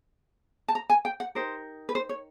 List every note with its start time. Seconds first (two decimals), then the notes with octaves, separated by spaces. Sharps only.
0.68 A5
0.75 A#5
0.90 G#5
1.05 G5
1.20 F#5
1.35 D#4 G4 A#4 C5
1.89 B4
1.95 C5
2.09 C#5